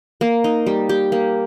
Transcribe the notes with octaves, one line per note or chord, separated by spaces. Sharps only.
A#3
D#4
G3
G4
A#3